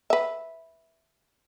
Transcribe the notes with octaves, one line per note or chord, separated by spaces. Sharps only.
B4 E5